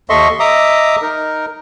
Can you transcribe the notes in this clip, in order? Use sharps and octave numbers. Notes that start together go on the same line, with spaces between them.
D#2 A4 D#5 E5 C6 C#6
D#5 E5 A#5 D6 D#6
D#4 A#4